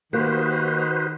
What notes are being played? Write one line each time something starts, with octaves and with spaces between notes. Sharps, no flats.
D#3 A#3 F#4 G4 B4 C5